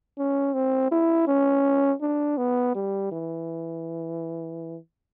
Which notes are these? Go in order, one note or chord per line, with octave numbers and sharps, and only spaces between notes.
C#4
C4
E4
C#4
D4
B3
G3
E3